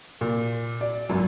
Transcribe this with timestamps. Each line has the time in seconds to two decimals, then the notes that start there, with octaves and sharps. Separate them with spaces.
0.21 A#2
0.81 D5
1.09 G#1 F#2